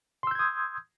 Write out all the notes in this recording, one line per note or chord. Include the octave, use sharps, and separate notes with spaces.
C6 D#6 E6 G6 G#6